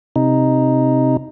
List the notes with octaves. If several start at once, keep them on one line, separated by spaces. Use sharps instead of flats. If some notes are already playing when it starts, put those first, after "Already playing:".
C3 D#4